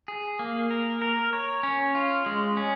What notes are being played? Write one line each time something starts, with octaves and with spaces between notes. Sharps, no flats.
G#4
A#3
A#4
A#4
C#5
C#4
F4
G#3
C#4